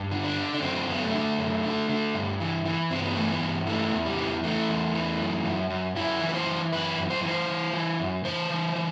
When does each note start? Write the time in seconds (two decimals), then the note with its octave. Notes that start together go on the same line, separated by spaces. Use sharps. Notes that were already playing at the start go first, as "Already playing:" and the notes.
Already playing: G2
0.12 D3
0.24 D4
0.37 D3
0.55 D4
0.62 F#2 C4
0.87 F#2 B3
1.00 A3
1.13 D3
1.38 F#2
1.64 D3
1.89 D3
2.15 G2
2.40 E3
2.65 E3
2.90 G2 C4
3.03 B3
3.15 E3 A3
3.28 B3
3.41 G2
3.67 E3 A3
3.93 E2
4.05 G3
4.18 E3
4.43 E3 A3
4.69 E2
4.94 E3
5.20 F#2
5.45 F#2
5.70 F#2
5.96 F#2 E4
6.21 E3
6.29 B4
6.34 C5
6.47 E3
6.72 F#2 B4
6.98 F#2
7.10 C5
7.23 E3
7.28 C5
7.48 E3
7.73 E3
7.99 F#2
8.25 E3 C5
8.50 E3
8.76 E3